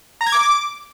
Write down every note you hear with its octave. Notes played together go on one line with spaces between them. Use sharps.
A#5
G#6
D6